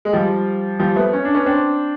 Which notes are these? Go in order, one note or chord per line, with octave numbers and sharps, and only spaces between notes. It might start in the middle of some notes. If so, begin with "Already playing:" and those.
G#3
F3 G3
F3 G3
A3 B3
C#4
D4
B3 C#4
C4 D4